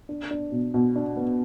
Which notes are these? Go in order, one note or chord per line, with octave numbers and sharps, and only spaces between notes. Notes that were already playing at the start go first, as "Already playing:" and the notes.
D4
D4
B2
B2
D4
B3